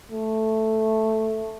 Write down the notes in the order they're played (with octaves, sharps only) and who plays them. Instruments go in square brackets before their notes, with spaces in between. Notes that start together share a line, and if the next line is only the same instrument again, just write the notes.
[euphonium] A3